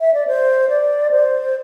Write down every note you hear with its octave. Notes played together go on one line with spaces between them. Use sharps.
E5
D5
C5
D5
C5